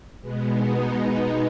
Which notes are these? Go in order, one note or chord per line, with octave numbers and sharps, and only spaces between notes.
B2 G#3 B3
D#4